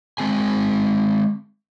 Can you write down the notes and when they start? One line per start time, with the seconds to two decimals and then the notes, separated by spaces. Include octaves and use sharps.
0.18 G#3 C4 G#4 G#5